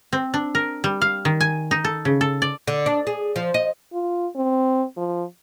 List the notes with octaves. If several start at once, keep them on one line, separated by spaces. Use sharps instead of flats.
C4
D4
A#4
G3
F5
D#3
G#5
D#4
A4
C#3
A4
D5
D3
D4
G#4
F3
D#5
F4
C4
F3